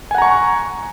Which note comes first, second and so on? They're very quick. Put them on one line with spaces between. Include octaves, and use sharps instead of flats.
G#5 F#5 A#5 C#6